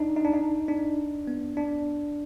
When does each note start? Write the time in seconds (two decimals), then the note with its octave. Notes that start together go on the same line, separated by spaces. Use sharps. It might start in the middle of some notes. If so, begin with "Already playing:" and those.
Already playing: D4 D#4
0.16 D#4
0.25 D4
0.33 D#4
0.68 D4
1.27 B3
1.57 D4